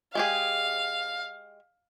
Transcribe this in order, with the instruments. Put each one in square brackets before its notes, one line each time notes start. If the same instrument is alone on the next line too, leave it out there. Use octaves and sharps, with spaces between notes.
[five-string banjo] G#3 G4 G#4 [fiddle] F5